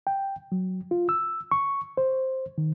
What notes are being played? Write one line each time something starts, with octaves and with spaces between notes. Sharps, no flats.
G5
F#3
F4
E6
C#6
C5
D#3